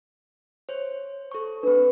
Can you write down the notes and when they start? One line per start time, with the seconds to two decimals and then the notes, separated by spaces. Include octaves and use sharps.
0.69 C5 C#5
1.31 A4 C#6
1.63 C4 D4 B4